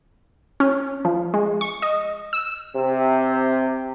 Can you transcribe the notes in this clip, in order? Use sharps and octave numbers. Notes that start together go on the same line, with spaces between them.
C#4
F3
G#3
C#6
D#5
E6
C3